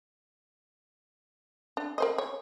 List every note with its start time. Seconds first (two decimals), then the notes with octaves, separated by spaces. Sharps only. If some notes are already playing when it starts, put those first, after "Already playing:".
1.77 D4
1.98 A#4 C5 D#5
2.18 C#5